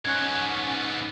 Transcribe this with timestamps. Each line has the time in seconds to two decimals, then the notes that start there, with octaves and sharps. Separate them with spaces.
0.05 G#2 B3 C#4 F#6 G#6